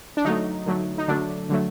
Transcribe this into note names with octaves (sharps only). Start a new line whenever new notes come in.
D4
D3 F#3 A3 D#4
D3 F#3 A3
D#4
D3 F#3 A3 D4
D3 F#3 A3